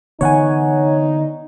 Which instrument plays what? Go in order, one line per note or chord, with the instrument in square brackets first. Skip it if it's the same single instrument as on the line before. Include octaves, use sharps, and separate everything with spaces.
[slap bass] D3 E3 B3 [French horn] D#4 [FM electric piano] C#5 F#5 G#5